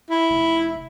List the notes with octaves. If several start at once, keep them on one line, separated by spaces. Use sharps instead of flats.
E4
F1